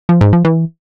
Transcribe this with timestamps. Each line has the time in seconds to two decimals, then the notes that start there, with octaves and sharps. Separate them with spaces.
0.09 F3
0.21 G#2
0.33 F3
0.45 E3